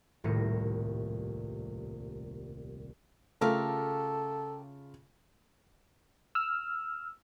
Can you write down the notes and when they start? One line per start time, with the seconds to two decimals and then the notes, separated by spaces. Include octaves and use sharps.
0.24 D#1 C2 A2 A#6 C#7 D#7
3.41 C#3 A3 F4 G4 A4 A#4 F5
6.35 E6 F6